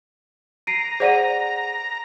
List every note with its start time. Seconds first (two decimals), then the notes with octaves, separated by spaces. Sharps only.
0.67 A#5 C7 D7 D#7
1.00 G#4 C5 D5 F#5 D#7